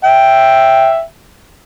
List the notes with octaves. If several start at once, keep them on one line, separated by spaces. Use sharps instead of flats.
E5 G5